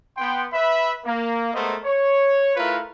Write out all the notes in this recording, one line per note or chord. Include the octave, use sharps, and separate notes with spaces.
B3 G5 C6
B4 E5 B5
A#3
G#3 A3 B3 A#4 C5 D#5
C#5
A3 E4 F4 A#4 B4